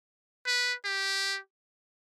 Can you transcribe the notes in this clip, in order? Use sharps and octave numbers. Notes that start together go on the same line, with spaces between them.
B4
G4